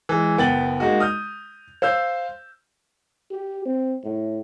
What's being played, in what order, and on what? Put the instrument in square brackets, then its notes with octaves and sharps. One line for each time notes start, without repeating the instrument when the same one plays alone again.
[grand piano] E3 G#3
F#1 B3 G5 A6 F#7
G#3 A#3 D#4 F#4
D#6 F6 G6
C5 F5 E6 G6
[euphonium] G4
C4
A2